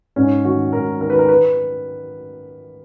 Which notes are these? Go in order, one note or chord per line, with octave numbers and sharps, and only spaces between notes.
G#2 C#4
D#3 F#4
G#2 A#4
D#3 A#4
B4
A#4
B4